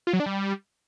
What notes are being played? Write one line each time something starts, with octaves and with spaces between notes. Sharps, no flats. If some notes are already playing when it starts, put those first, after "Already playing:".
F4
F#3
D4
G3